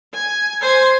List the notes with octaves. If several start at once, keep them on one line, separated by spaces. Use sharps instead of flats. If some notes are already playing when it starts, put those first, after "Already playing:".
G#5
C5 G#5